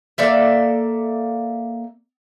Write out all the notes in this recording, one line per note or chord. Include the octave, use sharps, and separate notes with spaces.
A#3 A4 D5 E5